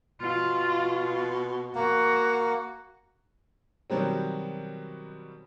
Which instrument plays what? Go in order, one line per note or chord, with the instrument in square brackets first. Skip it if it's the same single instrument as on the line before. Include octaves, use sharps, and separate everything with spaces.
[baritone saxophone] B2 [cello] F4
[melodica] A#3 [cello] F#4
[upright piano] B2 D#3 F#3 G3 C4